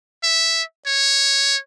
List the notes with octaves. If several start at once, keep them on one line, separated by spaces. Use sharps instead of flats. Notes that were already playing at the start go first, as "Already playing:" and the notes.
E5
C#5